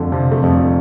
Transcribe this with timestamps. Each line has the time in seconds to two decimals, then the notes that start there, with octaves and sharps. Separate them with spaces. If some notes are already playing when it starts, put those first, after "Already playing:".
Already playing: F2 D3 G3 A3
0.12 C3 F3
0.32 A3
0.43 F2 G3